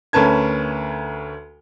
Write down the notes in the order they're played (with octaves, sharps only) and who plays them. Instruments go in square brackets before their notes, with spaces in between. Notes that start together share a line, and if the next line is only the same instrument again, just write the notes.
[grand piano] D2 C#4 A#4 B4 A5 G#6